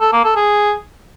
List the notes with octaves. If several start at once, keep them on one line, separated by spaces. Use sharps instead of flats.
A4
A#3
A4
G#4